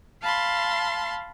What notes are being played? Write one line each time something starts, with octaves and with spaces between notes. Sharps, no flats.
F5 A5 B5 C6